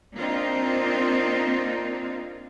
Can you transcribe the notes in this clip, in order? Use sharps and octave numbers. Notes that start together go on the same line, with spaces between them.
A#3 C4 D4 D#4 F4